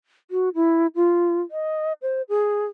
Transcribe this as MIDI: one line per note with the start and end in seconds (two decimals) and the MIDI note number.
0.31 0.49 66
0.55 0.87 64
0.95 1.41 65
1.51 1.93 75
2.02 2.22 72
2.29 2.65 68